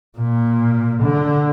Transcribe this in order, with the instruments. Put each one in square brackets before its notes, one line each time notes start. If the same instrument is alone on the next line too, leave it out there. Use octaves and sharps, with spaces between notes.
[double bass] A#2
D3